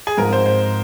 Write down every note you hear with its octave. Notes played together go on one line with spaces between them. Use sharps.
G#4
G#2 F3 C4 F4 A#4
C5
C5